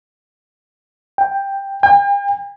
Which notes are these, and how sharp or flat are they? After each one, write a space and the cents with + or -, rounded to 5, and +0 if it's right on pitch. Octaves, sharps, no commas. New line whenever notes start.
G5 +10
G5 +45